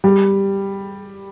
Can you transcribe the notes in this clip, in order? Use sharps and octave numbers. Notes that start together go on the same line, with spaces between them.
G3